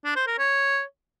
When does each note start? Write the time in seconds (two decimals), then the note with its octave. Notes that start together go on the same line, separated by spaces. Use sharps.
0.05 D4
0.16 C5
0.27 A#4
0.38 C#5